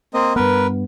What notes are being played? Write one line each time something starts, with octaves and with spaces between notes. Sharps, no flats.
A#3 C4 D#5
G2 B3 A#4 B4